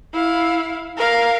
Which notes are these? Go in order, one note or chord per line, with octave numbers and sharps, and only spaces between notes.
E4 F5
A#4 F5